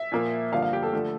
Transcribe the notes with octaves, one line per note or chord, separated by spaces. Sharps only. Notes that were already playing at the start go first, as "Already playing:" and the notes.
Already playing: E5
A#2 F3 A#3
G2 D3 F3 A#3 F5
F5
G4
A4
D3 F3 A3